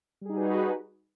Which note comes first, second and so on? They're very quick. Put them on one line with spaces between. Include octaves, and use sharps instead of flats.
G3 G#4 D#4 F#4 B4